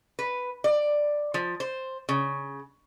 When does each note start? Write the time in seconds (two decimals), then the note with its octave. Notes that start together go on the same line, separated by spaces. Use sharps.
0.19 B4
0.64 D5
1.34 F3
1.60 C5
2.09 C#3